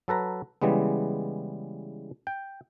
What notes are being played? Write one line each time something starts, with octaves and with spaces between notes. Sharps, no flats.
F#3 A4 B4 A#5
C#3 E3 G3 G#3 B3
G5